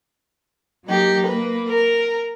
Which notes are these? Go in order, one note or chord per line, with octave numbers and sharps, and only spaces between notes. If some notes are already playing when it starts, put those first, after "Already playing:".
F#3 A#3 D#4 G4
A#3 B4
A#4 A#5